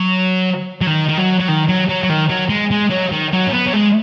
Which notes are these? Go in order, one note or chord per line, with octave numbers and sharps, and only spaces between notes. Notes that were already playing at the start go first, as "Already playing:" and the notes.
Already playing: F#3
F#3
D#3
D#3
F#3
F#3
D#3
F#3
F#3
F#3
D#3
F#3
G#3
G#3
F#3
D#3
F#3
C#4
B3
F#3
G#3